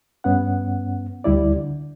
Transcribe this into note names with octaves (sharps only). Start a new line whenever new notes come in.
G2 B3 C#4 F#5
D2 G3 E4 D5
D3